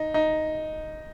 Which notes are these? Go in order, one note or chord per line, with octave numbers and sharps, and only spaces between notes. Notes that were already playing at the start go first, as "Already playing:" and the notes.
Already playing: D#4
D#4